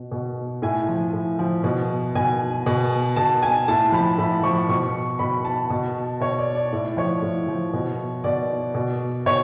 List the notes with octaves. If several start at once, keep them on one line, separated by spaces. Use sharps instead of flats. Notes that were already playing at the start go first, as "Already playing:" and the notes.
Already playing: B2
B2
A2 G#5
F3
A2
F3
B2
B2 G#5
B2
B2 A5
G#5
A2 A5
F3 B5
A2 B5
F3 C#6
B2 C#6
B2 B5
A5
B2
B2 C#5
D5
D5
A2 D5
F3 C#5
A2
F3
B2
B2 D5
B2
B2 C#5